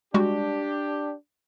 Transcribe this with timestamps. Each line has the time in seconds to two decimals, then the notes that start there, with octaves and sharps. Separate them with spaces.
0.14 G3 G#3 D4 F#4 G4